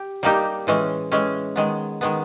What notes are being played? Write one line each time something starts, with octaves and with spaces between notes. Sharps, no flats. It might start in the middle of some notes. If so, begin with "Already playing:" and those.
Already playing: G4
G3 A#3 D#4 G4
A2 E3 G#3 C#4
A2 E3 G#3 C#4
D#3 G#3 B3
D#3 G#3 B3